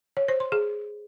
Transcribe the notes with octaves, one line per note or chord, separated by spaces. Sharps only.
C#5
C5
C6
G#4